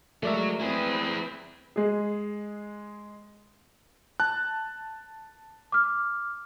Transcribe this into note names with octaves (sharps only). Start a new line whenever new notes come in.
F#3 G#3 A3 A#4 D5 E5
C4 E4 G#4 B4
G#3 G#4
A5 F#6
D6 F6